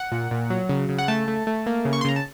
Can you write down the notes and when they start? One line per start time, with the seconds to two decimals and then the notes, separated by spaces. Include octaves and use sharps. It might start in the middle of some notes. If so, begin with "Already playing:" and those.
Already playing: F#5
0.12 A#2
0.31 A#2
0.50 F#3
0.69 C#3
0.89 C#3
0.98 F#5
1.08 A3 A5
1.28 A3
1.47 A3
1.66 A#3
1.85 C#3
1.93 C#6
2.01 C6
2.05 C#3 A#5
2.16 A5